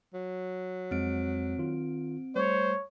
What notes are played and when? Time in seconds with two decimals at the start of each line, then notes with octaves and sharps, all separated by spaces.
0.14 F#3
0.91 F2 G#3 C4 D7
1.58 D#3 F4
2.36 G3 A3 C5 C#5